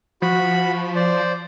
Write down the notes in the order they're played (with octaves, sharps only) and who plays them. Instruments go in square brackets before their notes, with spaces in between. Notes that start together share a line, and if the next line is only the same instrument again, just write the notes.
[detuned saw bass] F3 [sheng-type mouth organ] F#4 B5
[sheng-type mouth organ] C5 D5